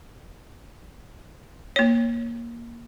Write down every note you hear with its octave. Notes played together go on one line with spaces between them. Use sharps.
A#3 C#5